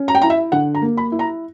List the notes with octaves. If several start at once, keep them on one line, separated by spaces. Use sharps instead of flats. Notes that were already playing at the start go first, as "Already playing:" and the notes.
Already playing: C#4
A#5
G5
E4 A#5
E5
D3 F#5
A#5
A#3
B5
E4
A#5